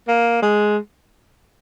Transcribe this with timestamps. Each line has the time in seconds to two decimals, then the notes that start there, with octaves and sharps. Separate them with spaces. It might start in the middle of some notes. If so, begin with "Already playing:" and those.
0.08 A#3
0.42 G#3